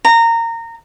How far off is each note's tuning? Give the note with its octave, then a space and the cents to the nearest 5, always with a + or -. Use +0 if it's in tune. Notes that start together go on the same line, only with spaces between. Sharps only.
A#5 -20